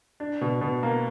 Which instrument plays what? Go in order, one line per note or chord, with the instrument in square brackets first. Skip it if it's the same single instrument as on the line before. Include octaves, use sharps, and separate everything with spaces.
[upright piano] D4
B2
B2
A#3